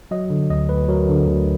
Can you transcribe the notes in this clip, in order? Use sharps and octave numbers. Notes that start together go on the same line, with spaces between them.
F#3 D#5
D3
D2 D#5
D2 B4
F#3 A#4
D3
D2